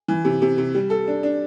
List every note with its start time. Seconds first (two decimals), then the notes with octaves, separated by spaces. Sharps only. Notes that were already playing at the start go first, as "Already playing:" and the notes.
0.08 E3
0.25 C3
0.42 C3
0.58 C3
0.75 G3
0.90 A4
1.08 D4
1.23 D4